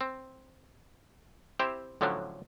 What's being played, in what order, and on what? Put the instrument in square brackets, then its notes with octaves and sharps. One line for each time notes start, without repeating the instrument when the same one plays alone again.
[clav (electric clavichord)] C4
C4 E4 G4 C5 E5
A2 D3 F3 F#3 C#4 D4